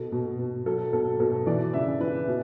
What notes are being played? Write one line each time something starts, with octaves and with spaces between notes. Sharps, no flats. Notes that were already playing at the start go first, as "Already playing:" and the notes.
Already playing: B2 A4
B2
B2
F#3 A4
B2 A4
B2 A4
E3 D5
C#3 E5
E3 B4
B2